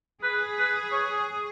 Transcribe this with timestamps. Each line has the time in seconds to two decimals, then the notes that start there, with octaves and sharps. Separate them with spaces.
0.22 G#4 B4
0.58 B4
0.92 C#5